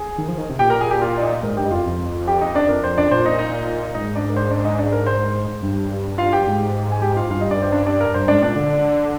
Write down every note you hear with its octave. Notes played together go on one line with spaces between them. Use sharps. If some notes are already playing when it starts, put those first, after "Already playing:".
Already playing: G#4 G#5
D#3
F3
D#3
C3
A#2 G4 G5
A#4 A#5
G#4 G#5
G4 G5
F4 F5
D5
D#4 D#5
G#2 A#4
G2 G4 G5
D#5
F2 F4 F5
F2
G4 G5
D#4 D#5
D4 D5
F2 A#4
C5
D4 D5
A#2 C5
D#4 D#5
D#4 D#5
G#2 D#4 D#5
D4 D5
A#4
C5
D4 D5
D#4 D#5
D4 D5
A#4
C5
G2
F4 F5
G4 G5
G#2
G#5
G4 G5
F4 F5
G2 F4 F5
D#4 D#5
D4 D5
C5
D4 D5
D4 D5
A#4
G2 C5
G#2 D4 D5
A#2 D4 D5
D3